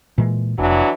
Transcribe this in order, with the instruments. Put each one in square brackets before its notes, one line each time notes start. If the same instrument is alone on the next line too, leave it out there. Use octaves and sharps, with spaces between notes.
[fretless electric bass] A#2 E3 G#3
[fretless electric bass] F1 [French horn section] E3 F#3 D4